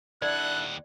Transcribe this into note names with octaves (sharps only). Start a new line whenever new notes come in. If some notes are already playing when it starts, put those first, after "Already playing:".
D#2 D4 E4 A4 D5 F#5 F#6